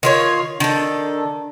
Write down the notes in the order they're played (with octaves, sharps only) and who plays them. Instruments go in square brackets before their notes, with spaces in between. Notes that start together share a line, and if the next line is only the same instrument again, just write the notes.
[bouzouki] D#3 F4 C#5
[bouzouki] D#3 A4 [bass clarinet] D4